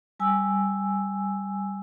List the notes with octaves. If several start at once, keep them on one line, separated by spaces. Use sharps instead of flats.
G3 G#5 E6